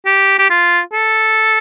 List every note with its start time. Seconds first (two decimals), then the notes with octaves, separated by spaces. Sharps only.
0.06 G4
0.39 G4
0.50 F4
0.93 A4